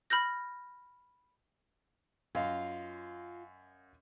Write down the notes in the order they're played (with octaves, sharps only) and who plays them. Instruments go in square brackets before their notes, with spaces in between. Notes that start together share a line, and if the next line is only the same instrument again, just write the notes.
[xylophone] B5 F6 G6 A#6
[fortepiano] F#2 D#5 F5 [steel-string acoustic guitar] F4